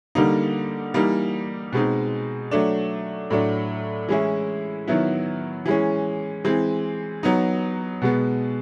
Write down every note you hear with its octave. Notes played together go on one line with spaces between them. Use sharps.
D3 G3 A#3 D#4
E3 G3 A#3 D#4
B2 G#3 C4 D#4
F#3 A3 D4
A2 F#3 A3 D4
E3 G#3 C#4 E4
D#3 F#3 B3 E4
E3 G#3 C#4
E3 G#3 C4
F#3 B3 D#4
B2 G#3 B3